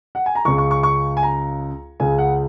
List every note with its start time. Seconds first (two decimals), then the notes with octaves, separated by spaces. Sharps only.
0.15 F#5
0.26 G#5
0.35 A#5
0.45 C#2 C#3 C#6
0.58 C#6
0.71 C#6
0.83 C#6
1.17 G#5
1.23 A#5
2.00 C#2 C#3 G#5
2.18 F#5